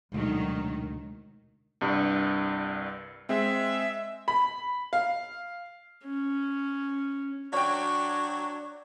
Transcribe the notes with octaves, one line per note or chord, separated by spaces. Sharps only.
F1 D2 B2 D#3 F#3 G#3
C2 G2
G#3 C4 E5
B5
F5
C#4
F#3 D4 C#5 G5 C#6